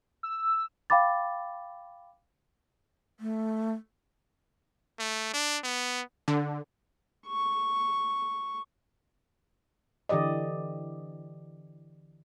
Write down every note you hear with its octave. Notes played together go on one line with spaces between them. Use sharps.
E6
F5 G5 B5 D6 A6
A3
A3
D4
B3
D3
C#6
D3 E3 G4 D5 D#5